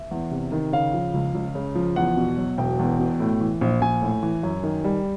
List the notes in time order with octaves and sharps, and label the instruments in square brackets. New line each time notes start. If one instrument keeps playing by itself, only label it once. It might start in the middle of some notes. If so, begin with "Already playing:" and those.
Already playing: [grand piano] E5
E2
C3
D#3
C#3 F5
F3
C#2
C#2
C#3
F3
E2 F#5
B2
F#3
E1 G5
E2
B2
A2
E3
A#1
A#1 G#5
A2
E3
F#2
D#3
G3